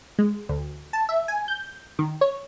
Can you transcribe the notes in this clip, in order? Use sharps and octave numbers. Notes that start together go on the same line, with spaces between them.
G#3
D2
A5
E5
G#5
G6
D#3
C#5